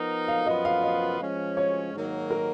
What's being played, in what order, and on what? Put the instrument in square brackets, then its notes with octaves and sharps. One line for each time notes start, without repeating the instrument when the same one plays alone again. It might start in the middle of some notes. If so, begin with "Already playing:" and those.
Already playing: [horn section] F3 B3 D#4 A#4
[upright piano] F5
[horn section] F#2 F3 B3 F4 B4 [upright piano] D#5
[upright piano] F5
D#5
[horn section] F3 G#3 C#4
[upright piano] C#5
[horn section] G#2 D#3 F#3 A#3
[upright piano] A#4